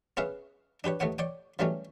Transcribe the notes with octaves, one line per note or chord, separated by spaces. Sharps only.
B3 C#4 G#4 B4 E5 F5
D4 G4 B4 C#5
D#2 A3 B3 C#5 F#5
C#5 D5 G5
C#3 E3 F#3 G3 A3 C#4